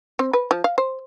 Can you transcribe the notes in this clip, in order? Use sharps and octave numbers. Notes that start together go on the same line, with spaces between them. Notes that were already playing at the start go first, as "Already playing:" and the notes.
C4
B4
F3
F5
C5